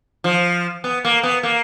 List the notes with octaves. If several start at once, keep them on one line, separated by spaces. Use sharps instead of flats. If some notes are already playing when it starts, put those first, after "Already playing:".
F3
B3
A#3
B3
A#3